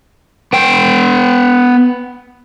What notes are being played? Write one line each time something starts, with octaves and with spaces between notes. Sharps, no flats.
B3 G5